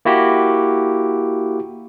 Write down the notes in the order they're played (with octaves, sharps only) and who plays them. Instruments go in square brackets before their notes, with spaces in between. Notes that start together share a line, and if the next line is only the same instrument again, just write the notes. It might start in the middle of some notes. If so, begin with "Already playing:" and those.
[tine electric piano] A#3 E4 F#4 G4